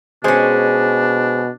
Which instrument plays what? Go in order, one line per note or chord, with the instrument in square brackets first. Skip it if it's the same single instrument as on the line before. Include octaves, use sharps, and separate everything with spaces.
[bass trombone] B2 [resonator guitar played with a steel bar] G#3 C#4 [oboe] D4 [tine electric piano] G#4 C5